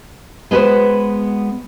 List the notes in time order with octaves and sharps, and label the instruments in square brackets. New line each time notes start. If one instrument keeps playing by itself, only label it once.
[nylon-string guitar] G#3 B3 F#4 B4 C5